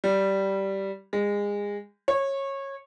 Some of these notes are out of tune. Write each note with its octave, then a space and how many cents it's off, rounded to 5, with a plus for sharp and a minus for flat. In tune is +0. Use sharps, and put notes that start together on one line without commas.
G3 -10
G#3 -25
C#5 -20